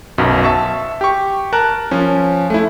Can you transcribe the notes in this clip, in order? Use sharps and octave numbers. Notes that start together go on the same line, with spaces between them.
B1 F#2 B2
E5 A5 C#6
G4 C#6
A#4 A5 F#6
F3 C#4
A3 E4